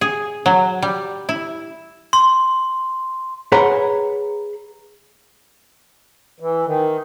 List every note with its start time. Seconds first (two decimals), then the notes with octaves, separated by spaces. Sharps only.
0.01 G#4
0.46 F#3
0.82 G3
1.29 E4
2.13 C6
3.52 G#4 B4 C#5 F#5 A#5 C6
6.40 E3
6.65 D#3